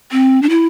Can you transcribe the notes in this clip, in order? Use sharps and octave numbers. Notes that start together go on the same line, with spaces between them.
C4
D4
E4